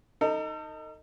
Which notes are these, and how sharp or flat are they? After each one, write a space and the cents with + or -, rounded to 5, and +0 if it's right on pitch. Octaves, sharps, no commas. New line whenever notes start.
D#4 +0 A4 +40